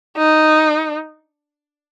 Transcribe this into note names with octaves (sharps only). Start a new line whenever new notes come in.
D#4